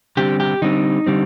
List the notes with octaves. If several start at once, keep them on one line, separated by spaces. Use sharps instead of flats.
D3 G3 C4 G4
G4
D3 G3 C4 D#4
D3 G3 C4